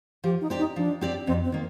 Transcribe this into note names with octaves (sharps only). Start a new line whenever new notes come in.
F3 G4
D#4
C4 G4 D5
D#4
F3 D4
C4 G4 D5
F2 C4
C4
D#3 A#3